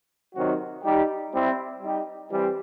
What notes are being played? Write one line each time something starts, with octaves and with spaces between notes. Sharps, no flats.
C3 D#3 F#3 C4 F#4
G3 D#4 G4
G3 C4 E4
G3 D#4 G4
E3 G3 C4